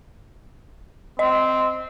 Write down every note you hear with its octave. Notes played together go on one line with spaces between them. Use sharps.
C4 D#5